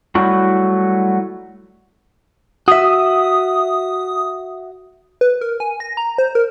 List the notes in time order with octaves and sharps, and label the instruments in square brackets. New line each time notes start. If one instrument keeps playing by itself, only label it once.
[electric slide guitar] F#3 G3 A3 E4 F#4
[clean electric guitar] F#4 E5 [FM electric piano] D#6
[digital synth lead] B4
A#4
G#5
A#6
A#5
C5
A#4